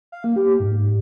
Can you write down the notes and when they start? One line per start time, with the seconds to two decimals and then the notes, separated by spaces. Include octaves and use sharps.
0.12 F5
0.24 A#3
0.36 G4
0.60 G#2